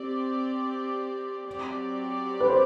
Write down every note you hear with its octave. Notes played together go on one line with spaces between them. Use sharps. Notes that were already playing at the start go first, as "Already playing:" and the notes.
Already playing: C4 G4 D5
F#3 C4 G4 D5
B4
C5